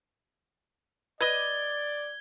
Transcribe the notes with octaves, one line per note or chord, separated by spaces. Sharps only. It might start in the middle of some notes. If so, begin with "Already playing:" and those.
B4 D5 D#5 G#6 G7